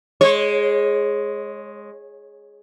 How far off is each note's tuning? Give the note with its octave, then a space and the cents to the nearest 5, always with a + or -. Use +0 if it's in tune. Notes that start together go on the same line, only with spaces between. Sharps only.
G#3 +0 C#5 -30